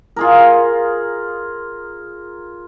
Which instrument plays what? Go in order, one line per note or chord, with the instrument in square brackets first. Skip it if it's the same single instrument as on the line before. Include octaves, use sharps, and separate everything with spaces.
[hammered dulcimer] F4 G#4 A#4